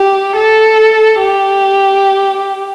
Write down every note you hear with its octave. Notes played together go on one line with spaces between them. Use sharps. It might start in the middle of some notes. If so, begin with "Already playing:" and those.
Already playing: G4
A4
G4